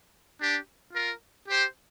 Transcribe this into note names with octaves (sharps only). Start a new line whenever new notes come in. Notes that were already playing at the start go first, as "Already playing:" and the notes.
D4 G4
F4 A#4
G4 C5